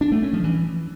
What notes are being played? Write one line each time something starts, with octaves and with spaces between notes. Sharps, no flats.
D4
A3
C#4
F3
E3